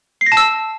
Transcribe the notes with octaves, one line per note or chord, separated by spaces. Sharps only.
C7
A#6
A5
E6